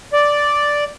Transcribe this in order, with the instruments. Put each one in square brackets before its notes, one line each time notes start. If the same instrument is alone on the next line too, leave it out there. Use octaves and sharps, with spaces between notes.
[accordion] D5